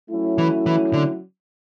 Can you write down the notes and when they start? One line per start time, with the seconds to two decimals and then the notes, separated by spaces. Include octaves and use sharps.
0.10 F#3 A3 C#4 E4
0.38 E3
0.66 E3
0.93 D3